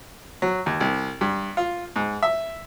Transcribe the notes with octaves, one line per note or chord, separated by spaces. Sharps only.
F#3
D#2
C2
G2
F4
G#2
E5